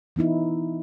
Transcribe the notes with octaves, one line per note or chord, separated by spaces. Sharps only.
E3 B3 D#4 E4